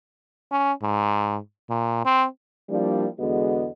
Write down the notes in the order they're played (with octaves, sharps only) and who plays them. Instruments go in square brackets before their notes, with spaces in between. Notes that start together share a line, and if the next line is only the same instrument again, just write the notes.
[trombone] C#4
G#2
A#2
C4
[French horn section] F3 G3 A#3 D4 E4 D5
E2 D3 G#3 B3 F#4 D#5